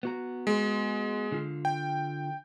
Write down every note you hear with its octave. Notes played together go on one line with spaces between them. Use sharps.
B3 F#4 A#5
G#3
D3 F4
G5